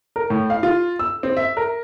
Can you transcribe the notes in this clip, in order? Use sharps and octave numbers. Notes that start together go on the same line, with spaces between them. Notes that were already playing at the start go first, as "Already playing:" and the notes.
A#4
A2
F5
F4
E6
C4
E5
A#4